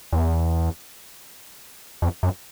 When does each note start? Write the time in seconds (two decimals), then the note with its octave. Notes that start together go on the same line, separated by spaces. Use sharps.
0.13 E2
2.02 F2
2.23 F#2